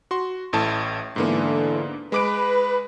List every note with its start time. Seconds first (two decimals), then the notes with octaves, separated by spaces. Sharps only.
0.11 F#4 C6
0.53 A1 A2 A5
1.16 G#2 D3 E3 A#3 B3
2.12 G#3 B4 D6 D7